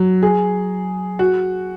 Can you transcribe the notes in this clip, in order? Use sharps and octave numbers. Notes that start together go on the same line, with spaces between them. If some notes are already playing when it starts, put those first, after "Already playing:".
Already playing: F#3
G#4
F#4